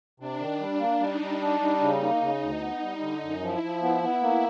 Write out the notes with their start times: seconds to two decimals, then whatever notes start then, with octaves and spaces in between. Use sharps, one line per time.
0.20 C3 D4
0.40 D#3
0.60 G3
0.80 A#3
1.00 G3 D#4
1.21 G3
1.41 D4
1.61 G3
1.81 C#3
2.01 A#3
2.21 C#3
2.41 D2
2.61 B3
2.82 G3
3.02 D3
3.22 F#2
3.41 F3 E4
3.63 F3
3.83 B3
4.03 B3
4.22 A#3